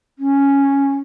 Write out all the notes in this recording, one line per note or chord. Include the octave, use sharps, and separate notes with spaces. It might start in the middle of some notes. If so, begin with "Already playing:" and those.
C#4